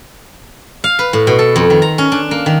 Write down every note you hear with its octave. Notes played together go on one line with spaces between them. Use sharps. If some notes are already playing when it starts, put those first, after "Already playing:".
F5
B4
A2
B2
A4
F2
D#3
A#5
C#4
D4
A#3
D#3